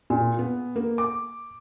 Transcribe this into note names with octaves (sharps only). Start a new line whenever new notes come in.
A#2
B3
A#3
D6